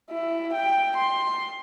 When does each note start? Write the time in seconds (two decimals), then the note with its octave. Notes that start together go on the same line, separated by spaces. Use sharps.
0.11 E4
0.54 G5
0.97 C6